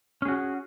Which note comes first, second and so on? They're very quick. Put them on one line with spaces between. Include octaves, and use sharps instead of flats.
C#4 G#4 F#4